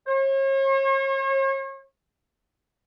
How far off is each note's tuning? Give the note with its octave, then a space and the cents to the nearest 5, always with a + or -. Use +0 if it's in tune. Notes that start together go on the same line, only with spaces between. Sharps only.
C#5 -40